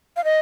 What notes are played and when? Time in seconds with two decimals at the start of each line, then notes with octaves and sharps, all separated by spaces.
0.17 F5
0.25 D#5